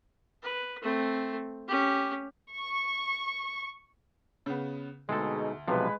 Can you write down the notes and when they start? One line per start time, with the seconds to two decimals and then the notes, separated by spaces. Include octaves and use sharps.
0.42 B4
0.82 A3 C4
1.68 C#4 G4
2.54 C#6
4.46 C#3 B3
5.09 D2 B2 G#3 C4 D#4 G#4 A4
5.68 B1 C3 F3 G#3 B4